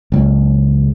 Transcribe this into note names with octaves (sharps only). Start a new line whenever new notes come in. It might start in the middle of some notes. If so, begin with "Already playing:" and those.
F#1 C#2